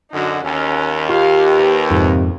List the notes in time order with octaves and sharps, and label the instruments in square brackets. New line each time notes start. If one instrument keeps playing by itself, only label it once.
[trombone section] F#2 D3 [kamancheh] D#4 F#4
[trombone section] D#2 [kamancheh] C#4 F5
[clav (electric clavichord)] F4 [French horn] G4 [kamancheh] F5
[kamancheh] A#4 B4
[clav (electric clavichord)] F2 G#2 [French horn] C3